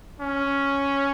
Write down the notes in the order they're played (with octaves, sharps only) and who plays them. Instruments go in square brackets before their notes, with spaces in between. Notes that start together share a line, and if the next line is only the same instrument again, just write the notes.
[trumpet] C#4